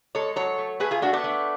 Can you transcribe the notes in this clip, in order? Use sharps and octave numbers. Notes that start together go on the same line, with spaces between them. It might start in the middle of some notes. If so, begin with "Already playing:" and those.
G#3 A4 C#5
F#3 A4 C#5
A3
A3 G#4 B4
F4 G#4
A3 D4 F#4
B3 D4
A3